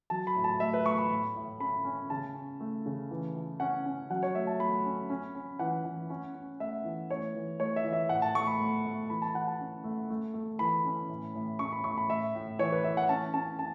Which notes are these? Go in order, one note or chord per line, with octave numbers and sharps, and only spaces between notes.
F#3 A5
B5
A2
A5
A3 E5
B4
A3 C#6
B5
A2
A2
C#4 B5
C#4
C#3 A5
C#4
A3
C#3
E3
E3
C#4 F#5
C#4
F#3 F#5
C#5
A3 E5
A5
A3 B5
C#4
C#4
C#4
E3 F#5
E3
C#4
C#4
A3 E5
E3
A3 C#5
E3
A3 C#5
E5
E3
E5
A2 F#5
A5
A3 C#6
B5
A3
A3
E3 B5
A5
E3 F#5
A5
C#4
A3
A3
A3
E3 B5
C#4
A2
A2
C#4 C#6
B5
A2 C#6
B5
A2 E5
A2
E3 C#5
B4
E3 E5
F#5
C#4 A5
C#4 A5
C#4 A5